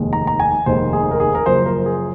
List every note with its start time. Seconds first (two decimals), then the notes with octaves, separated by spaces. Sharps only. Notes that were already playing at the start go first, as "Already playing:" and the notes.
Already playing: F1 D#2 D#3 G#3
0.13 A#5
0.27 A#5
0.40 G#5
0.66 F1 D#2 D#3 G#3 C5
0.93 G#4
1.11 A#4
1.20 G#4
1.35 A#4
1.46 F#1 F#2 F3 C5
1.66 A#4
1.86 G#4